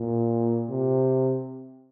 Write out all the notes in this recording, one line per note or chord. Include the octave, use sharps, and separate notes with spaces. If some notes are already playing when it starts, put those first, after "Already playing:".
Already playing: A#2
C3